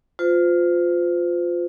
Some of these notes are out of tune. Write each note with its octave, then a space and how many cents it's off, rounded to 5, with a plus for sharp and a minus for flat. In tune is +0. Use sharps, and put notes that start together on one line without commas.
F4 +10 C5 -35